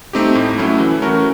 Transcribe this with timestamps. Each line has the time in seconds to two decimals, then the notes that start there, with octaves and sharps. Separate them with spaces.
0.13 A3 C4 D#4 G4
0.35 A2
0.58 F#3 A3 C#4 E4
0.80 E3
1.02 A3 C#4 F#4 A#4